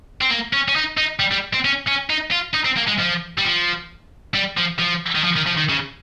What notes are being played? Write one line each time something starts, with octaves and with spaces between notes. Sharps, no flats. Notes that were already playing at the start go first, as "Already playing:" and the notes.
C4
A#3
C#4
C#4
D#4
D#4
G3
G3
C4
C#4
C#4
D#4
F4
D#4
C4
A#3
G#3
F3
G3
F3
G3
F3
F3
D#3
F3
D#3
F3
D#3
C#3